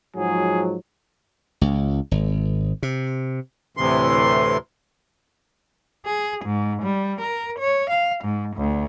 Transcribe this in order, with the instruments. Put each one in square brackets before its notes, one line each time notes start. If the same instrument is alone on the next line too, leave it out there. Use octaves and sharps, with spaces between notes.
[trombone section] G#2 F3 F#3 [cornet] G#4
[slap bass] C#2
G#1
C3
[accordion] D2 A2 C3 E3 C6
[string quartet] G#4
G#2
G3
A#4
C#5
F5
G#2
D2